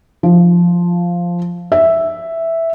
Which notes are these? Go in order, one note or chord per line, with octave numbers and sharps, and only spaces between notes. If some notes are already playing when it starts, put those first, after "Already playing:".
F3
E5